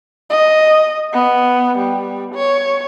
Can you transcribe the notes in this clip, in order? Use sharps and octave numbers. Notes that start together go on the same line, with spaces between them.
D#5
B3
G3
C#5